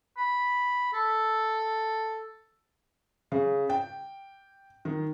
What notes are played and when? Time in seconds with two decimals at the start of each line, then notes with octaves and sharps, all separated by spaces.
0.17 B5
0.93 A4
3.32 C#3
3.70 G5
4.85 D#3